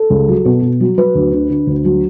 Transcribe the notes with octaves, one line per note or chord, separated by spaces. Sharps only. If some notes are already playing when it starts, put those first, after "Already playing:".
Already playing: A4
C#2
F#3
B2
B2
F#3
F#3 B4
D2
D3
D3
D2
F#3